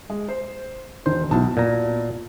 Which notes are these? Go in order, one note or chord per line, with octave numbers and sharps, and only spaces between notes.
G#3
C5
E1 D#3 C5
B1 B2 E4 A5
A#2 A#5